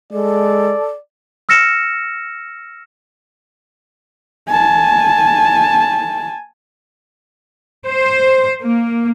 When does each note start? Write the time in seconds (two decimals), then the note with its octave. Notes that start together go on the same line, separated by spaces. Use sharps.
0.12 G#3 A4 D5
1.49 E6 F6 A#6 C#7 E7
4.49 G#5 A5
7.86 C5
8.62 A#3